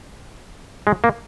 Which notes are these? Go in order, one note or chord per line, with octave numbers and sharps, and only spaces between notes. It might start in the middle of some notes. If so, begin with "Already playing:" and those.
G#3
A#3